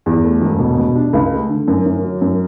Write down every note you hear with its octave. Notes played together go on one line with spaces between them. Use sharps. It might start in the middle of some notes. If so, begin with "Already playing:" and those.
E2
A3
E1
B2
B2
D4
C#2
A3
D3
F#2
F#2
F#3
F#2